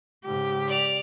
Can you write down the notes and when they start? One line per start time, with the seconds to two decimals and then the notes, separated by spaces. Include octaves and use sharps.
0.25 G#2 C#3 G4
0.68 D5 F7